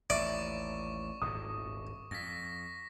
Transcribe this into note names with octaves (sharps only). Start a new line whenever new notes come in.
A1 D#2 D5 E5 C#6 D6
D#1 G#1 A2 D#6
F2 A#6 B6